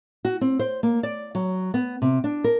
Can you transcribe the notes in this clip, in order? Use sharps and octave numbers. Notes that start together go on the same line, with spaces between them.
F#4
C4
C5
A#3
D5
F#3
B3
C3
D4
A#4